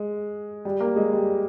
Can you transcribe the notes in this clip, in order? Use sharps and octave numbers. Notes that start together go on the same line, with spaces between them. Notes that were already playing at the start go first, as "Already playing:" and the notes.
Already playing: G#3
G3
A#3
G#3
G3